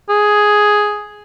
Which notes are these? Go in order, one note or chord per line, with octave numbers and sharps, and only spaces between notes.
G#4